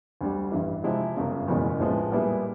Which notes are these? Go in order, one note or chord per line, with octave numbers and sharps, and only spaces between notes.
D2 D3 G3
A1 G2 E3
C3 F3 G#3 C4 E4
G1 F#2 C#3
F#1 E2 B2 G#3 C#4
A#1 A2 F3 G#3 B3
A#2 G3 B3 E4 G#4